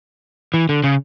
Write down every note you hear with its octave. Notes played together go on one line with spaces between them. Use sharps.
E3
D3
C#3